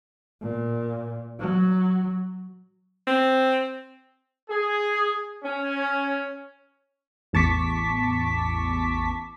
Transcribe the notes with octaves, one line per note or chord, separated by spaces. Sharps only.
A#2
F#3
C4
G#4
C#4
A1 E2 A5 C#6 D6 B6